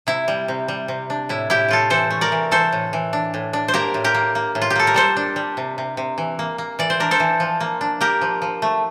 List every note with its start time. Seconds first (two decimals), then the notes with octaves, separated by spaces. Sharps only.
0.07 C3 E4
0.28 G3
0.48 C3
0.68 G3
0.88 C3
1.10 D4
1.29 A2 E4
1.50 A2 E4 G4
1.68 A2 F4 A4
1.90 E3 A4 C5
2.10 A3
2.21 A#4 D5
2.32 E3
2.51 E3 A4 C5
2.73 A2
2.93 E3
3.13 D4
3.34 A2
3.53 D4
3.68 C5
3.74 A#3 G4 A#4
3.94 A2
4.04 G4 A#4
4.14 A#3
4.35 A#3
4.55 A2
4.62 F4
4.70 G4
4.76 A#3 A4
4.87 A#4
4.94 G3 A4 C5
5.17 D4
5.36 G3
5.57 C3
5.78 C3
5.97 C3
6.18 E3
6.39 A#3
6.58 A#3
6.79 E3 D5
6.90 C5
7.00 D4 A#4
7.11 A4 C5
7.20 E3
7.40 F3
7.60 A#3
7.81 D4
8.01 A#3 G4 A#4
8.21 F3
8.42 F3
8.62 A3